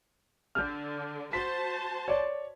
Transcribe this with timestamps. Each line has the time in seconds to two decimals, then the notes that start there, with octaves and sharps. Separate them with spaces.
0.55 D3 F6 G6
1.33 F#4 C5 A5 B6
2.08 C#5 D5